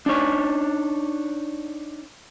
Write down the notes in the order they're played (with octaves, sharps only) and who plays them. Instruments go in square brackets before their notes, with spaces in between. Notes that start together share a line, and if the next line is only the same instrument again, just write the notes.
[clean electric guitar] D4 D#4 C#5